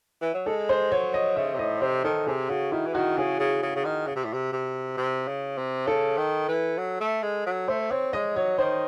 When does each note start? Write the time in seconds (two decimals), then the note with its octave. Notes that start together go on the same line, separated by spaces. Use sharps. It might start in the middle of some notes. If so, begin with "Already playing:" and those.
0.22 E3
0.34 F#3
0.46 G#3 A4
0.69 C5
0.91 F#3 C#5
1.14 D#5
1.36 C#3 E5
1.55 C3
1.59 A2 D#5
1.82 C3 C5
2.04 D#3 A4
2.27 C3 G#4
2.49 C#3 F#4
2.72 D#3 E4
2.86 E3
2.94 D#3 F#4
3.17 C#3 G#4
3.39 C#3
3.62 C#3
3.76 C#3
3.85 D#3
4.07 C#3
4.16 C3
4.25 A2
4.33 C3
4.52 C3
4.97 C3
5.28 C#3
5.58 C3
5.87 C#3 A4
6.18 D#3
6.48 E3
6.78 F#3
7.01 A3
7.23 G#3
7.46 F#3
7.68 A3 C5
7.91 C4 C#5
8.13 G#3 D#5
8.36 F#3 C#5
8.58 D#3 C5